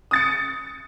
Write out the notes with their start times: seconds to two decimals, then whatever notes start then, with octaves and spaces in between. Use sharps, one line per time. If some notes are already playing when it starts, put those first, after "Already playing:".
0.11 D#6 A6 C#7